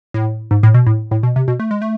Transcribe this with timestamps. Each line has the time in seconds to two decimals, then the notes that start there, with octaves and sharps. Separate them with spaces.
0.14 A2
0.51 G#2
0.63 A2
0.74 B2
0.86 A2
1.11 A2
1.23 B2
1.36 C3
1.48 B2
1.60 A3
1.71 G#3
1.82 A3